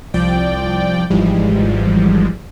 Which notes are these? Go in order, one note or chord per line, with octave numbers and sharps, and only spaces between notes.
C2 F3 D5 G5
G#1 G#2 E3 F3 G3 G#3